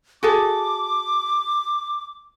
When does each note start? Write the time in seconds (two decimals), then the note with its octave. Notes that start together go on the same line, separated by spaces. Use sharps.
0.23 F#4 G#4 A4 D6